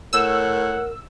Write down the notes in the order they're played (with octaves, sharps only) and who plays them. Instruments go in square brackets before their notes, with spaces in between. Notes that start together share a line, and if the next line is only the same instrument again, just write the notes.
[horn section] A2 C#5 F#5 [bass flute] A#4 [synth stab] E6